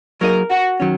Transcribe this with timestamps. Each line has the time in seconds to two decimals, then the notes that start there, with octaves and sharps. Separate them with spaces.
0.21 F#3 A#3 D#4 G#4 A#4 D#5
0.51 F#4
0.80 D#3 F#3 C#4